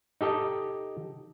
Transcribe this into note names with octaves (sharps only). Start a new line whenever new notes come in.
D#4 G4 A4 D#5